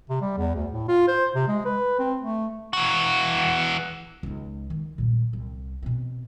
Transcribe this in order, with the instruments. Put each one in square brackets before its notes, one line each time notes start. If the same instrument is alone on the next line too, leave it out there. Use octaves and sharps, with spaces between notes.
[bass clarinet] C3
G3
E2
D2
A2
F4
C5
C3
G#3
B4
C4
A3
[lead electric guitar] E3 F#4
[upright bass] C#2 D#4
D#3
A#2 G3
C2
B2 C4